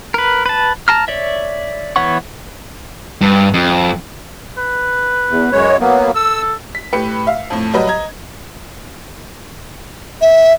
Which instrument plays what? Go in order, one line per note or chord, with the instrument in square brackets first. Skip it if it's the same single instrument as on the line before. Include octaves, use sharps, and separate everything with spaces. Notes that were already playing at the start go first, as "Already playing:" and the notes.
[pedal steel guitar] A#4 B4
B4 A5
A5 A#5 F6
C#5 D5 E5
E3 B3 C#5 F#5 C#6
[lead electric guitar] G2
F2
[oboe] B4
[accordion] E2
F#2 G#3 C#5
F#3 A#3 B3
[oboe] A4 [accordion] E6
[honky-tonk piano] B6
A2 G4 B4 C#7
E5 F5
F2 A2
F#3 G3 B4 D#5
D#5 A#5 G#6
[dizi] E5